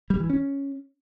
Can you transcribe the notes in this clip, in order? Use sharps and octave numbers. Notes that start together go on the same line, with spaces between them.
G3
E3
C#4